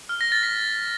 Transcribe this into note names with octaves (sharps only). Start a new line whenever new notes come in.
F6
A#6
A6
B6